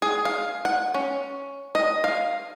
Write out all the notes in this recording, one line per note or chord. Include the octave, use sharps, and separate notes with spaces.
G#4
F5
F#5
C#4
D#5
F5